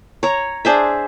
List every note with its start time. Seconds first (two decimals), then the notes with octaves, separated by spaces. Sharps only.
0.23 C#5 A#5
0.65 D4 G#4 C5 E5